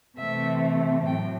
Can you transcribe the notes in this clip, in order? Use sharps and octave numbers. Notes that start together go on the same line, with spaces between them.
C3 E3 A3 C4 E5
A2 F#3 G5